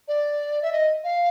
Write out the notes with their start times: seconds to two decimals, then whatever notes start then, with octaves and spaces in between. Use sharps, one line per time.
0.08 D5
0.62 E5
0.72 D#5
1.04 F5